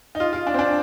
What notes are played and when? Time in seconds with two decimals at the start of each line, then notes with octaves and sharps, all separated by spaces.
0.15 D#4
0.20 F4
0.33 F4
0.47 D4
0.54 C4
0.59 D4